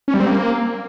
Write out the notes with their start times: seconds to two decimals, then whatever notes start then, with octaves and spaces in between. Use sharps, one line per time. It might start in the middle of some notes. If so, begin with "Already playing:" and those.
0.08 C#4
0.14 G3
0.20 C4
0.26 A#3